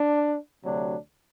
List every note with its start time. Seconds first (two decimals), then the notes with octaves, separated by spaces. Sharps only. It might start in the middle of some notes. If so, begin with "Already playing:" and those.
Already playing: D4
0.64 D2 C3 F#3 D4